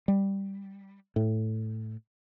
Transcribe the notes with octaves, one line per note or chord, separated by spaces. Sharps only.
G3
A2